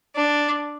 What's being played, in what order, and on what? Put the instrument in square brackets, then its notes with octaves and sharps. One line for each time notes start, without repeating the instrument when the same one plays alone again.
[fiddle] D4